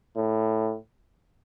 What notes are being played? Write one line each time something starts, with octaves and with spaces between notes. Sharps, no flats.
A2